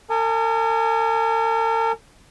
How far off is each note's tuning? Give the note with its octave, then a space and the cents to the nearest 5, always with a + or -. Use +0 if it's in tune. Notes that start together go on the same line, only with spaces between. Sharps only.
A#4 -45 G#5 +15 D#6 -30